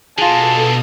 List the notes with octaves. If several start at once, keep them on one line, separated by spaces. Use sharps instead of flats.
B2 D3 A#3 F4 G#4 A4 A5 D#6